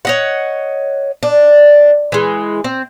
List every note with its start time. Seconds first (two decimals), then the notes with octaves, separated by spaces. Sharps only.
0.05 C#5 D#5 F#5
1.23 D4
2.12 E3 G#3
2.64 C4